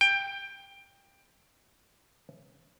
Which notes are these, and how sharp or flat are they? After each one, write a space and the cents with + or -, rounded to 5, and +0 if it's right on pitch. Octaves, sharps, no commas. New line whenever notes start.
G5 +15